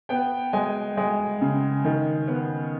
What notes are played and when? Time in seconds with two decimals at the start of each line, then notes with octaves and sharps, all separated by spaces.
0.09 B3 G5
0.53 G#3 G#5
0.97 G#3
1.41 C#3
1.85 D#3
2.28 B3